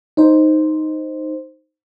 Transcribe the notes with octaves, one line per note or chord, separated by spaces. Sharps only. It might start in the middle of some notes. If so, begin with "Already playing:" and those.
D#4 C5